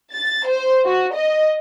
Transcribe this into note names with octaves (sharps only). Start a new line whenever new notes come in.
A6
C5
F#4
D#5